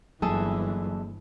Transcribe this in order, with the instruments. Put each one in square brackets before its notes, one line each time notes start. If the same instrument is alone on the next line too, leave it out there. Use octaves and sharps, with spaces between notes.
[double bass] G1 E3 [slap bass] F#3 A#3 [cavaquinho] G#4 A4 E5